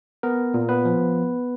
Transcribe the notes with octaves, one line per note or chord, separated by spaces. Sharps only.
B3 A#4
A#2
B3 B4
F3